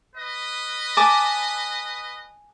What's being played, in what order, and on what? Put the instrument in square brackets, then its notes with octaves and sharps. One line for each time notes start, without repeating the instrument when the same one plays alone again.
[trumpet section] B4 D#5
[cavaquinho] G#5 A5 D6